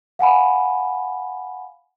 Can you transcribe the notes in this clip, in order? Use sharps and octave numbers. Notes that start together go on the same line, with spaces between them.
F5 F#5 G#5 B5